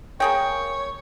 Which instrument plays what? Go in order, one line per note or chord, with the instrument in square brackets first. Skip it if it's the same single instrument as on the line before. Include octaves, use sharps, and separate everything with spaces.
[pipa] A#3 G#4 G5 [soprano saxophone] C#5